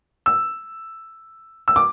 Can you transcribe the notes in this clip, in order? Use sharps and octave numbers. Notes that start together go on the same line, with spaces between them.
E6
E6
D6